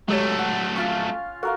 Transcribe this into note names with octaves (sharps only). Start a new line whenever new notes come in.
F#3 G#3 A3 G4 C#5
F#5
C#4 F4 F5
F#4 A4 A#4 F5